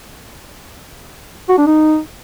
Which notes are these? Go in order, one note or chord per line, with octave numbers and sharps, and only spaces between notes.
F#4
D4
D#4